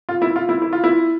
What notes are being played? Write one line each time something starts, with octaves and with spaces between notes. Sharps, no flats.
F4
E4
F4
E4
E4
F4
E4